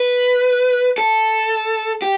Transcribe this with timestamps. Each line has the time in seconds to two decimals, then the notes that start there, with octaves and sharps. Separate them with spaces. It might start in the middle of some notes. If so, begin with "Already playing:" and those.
Already playing: B4
0.98 A4
2.02 G4